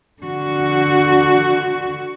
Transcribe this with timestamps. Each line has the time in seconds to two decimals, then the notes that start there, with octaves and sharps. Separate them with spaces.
0.22 D3 F#4